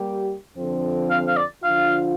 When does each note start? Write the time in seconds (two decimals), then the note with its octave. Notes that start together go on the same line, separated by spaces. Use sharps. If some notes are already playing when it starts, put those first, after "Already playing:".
Already playing: G3 A#3 G4
0.56 F2 D3 F3 C4
1.10 F5
1.27 F5
1.36 D5
1.63 D3 F3 D4 F4 F5